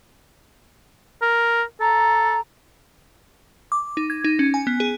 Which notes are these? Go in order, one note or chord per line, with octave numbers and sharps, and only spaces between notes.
A#4
A4 A#5
D6
D#4
G#6
D#4
C#4
G#5
B3
G#4